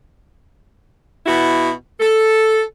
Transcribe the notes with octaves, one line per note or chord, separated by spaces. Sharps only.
B2 B3 E4 F#4
A4